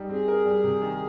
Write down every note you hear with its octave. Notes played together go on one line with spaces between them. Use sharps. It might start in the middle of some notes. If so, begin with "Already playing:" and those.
Already playing: G3 D#4 G4
C4 G#4
A#4
G3
C3
D#3